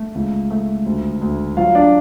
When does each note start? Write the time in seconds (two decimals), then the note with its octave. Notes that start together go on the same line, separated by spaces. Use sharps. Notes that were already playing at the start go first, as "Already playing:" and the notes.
Already playing: A3
0.15 C#2
0.50 A3
0.86 D2
1.21 D2
1.57 F#3 F4 F5
1.75 D4 D5